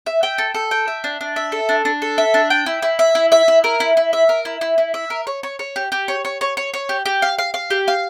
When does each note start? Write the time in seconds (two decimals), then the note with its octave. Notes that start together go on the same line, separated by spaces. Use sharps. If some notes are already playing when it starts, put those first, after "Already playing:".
0.06 E5
0.23 G5
0.38 A4
0.55 A4
0.71 G5
0.88 E5
1.04 D4
1.21 D4
1.36 E5
1.52 A4
1.69 D4
1.85 D4
2.02 A4
2.18 E5
2.34 D4
2.50 G5
2.66 E4
2.82 E4
2.99 E5
3.15 E4
3.32 E5
3.48 E4
3.64 A#4
3.80 E4
3.97 E4
4.13 E5
4.29 A#4
4.45 E4
4.61 E4
4.78 E4
4.94 E5
5.10 A#4
5.27 C#5
5.43 C#5
5.59 C#5
5.76 G4
5.92 G4
6.08 C#5
6.25 C#5
6.41 C#5
6.57 C#5
6.74 C#5
6.89 G4
7.05 G4
7.22 F5
7.38 F5
7.54 F5
7.70 G4
7.88 F5